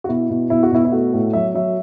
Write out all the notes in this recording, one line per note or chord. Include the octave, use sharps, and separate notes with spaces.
F#4
B2 E4
B2
B2 E4
F#4
B2 E4
E4
A3 F#4
A2
F#3 E5
F#3 E5